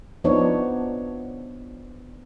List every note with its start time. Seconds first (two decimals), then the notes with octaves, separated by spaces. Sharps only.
0.24 F3 B3 D4 D#4 C#5